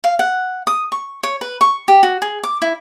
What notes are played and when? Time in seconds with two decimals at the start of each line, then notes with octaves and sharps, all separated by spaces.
0.04 F5
0.19 F#5
0.67 D#6
0.92 C#6
1.23 C#5
1.41 B4
1.61 C#6
1.88 G4
2.03 F#4
2.22 G#4
2.43 D6
2.62 E4